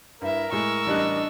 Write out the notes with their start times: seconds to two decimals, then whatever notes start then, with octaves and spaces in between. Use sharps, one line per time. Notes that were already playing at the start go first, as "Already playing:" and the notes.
0.22 G2 E4 A#4 E5
0.52 A2 G#3 C#6 E6
0.86 A1 G3 D4 D#5 F#6